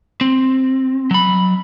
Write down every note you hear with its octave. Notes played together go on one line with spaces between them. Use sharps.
C4
F#3 B5